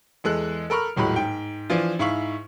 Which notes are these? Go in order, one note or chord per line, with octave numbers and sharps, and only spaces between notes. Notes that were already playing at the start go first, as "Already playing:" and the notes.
E2 G#3 A4 F#6
A4 A#4 B5 C#6 F6
D#1 A2 F#3 G#3 B5
G#2 G5
E3 F3 D4 F4
G#2 E4 F5 C#6 F#7